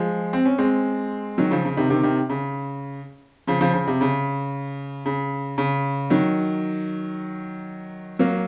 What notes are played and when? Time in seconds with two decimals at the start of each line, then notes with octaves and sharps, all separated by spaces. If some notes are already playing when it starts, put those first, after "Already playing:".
Already playing: F3 G#3
0.33 C4
0.45 C#4
0.58 G#3 C4
1.38 D#3 F#3
1.51 C#3 F3
1.65 C#3
1.77 C3 D#3
1.90 C3 D#3
2.03 C3 D#3
2.30 C#3
3.47 C#3 F3
3.61 C#3 F3
3.74 C#3
3.87 C3
4.01 C#3
5.06 C#3
5.58 C#3
6.10 D#3 F#3
8.19 F#3 A#3